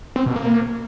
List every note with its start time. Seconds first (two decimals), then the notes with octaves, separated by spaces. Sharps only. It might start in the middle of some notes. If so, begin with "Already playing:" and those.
0.16 C4
0.26 B2
0.36 A#3